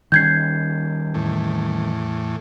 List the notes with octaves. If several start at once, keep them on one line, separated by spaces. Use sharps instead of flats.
D#3 G3 C#4 G6 G#6 C7
E2 A2